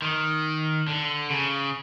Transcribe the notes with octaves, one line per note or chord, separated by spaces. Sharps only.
D#3
D3
C#3